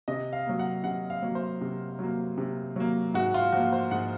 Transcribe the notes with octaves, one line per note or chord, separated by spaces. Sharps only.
C3 D#5
F5
F#3 A#3
F#5
C3 F#5
F5
F#3 A#3
C5
C3
F#3 A#3
C3
F#3 A#3
G#2 F#4
F4
F3 A#3 F#4
C5
G#2 F#5